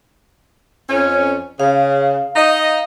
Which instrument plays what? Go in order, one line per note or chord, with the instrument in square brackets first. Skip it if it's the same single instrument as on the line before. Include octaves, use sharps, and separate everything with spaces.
[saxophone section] F2 C#4
[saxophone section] C#3 [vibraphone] F5
[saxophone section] D#4 D#5